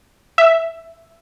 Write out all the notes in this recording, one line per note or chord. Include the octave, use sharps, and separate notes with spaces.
E5